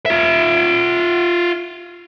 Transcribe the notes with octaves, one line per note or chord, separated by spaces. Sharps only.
F4 E5